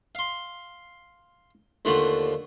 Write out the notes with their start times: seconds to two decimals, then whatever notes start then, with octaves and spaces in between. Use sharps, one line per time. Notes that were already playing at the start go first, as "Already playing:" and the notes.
0.15 F5 C6
1.85 D#2 D3 F3 A3 F4 F#4